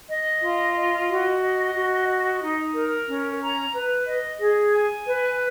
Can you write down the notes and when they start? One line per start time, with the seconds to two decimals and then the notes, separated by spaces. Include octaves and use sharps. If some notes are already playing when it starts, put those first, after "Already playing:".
0.09 D#5
0.42 F4
0.75 D#5
1.08 F#4
1.41 D#5
1.74 F#4
2.08 D#5
2.41 D#4
2.74 A#4
3.07 C#4
3.40 A#5
3.74 B4
4.07 D#5
4.40 G#4
4.73 G#5
5.07 B4